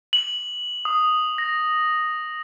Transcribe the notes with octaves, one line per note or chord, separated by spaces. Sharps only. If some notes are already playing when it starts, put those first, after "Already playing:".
F#7
D#6
A#6